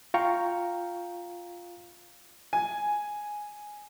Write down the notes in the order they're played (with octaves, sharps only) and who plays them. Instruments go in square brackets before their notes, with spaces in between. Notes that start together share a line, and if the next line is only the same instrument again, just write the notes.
[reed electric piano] F4 F5 G5 A#5 C#6
[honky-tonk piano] G#5